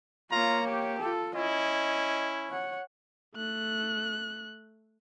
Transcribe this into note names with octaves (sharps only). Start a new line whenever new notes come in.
A#3 F4 C#5 A#5
G4
F4 A4
C#4 E4 D#5
C#5 F#5
A3 F#6